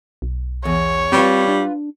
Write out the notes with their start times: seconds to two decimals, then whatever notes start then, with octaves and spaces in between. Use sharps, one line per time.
0.22 B1
0.65 E2 C#5
1.12 G3 C4 F4 B4
1.48 D4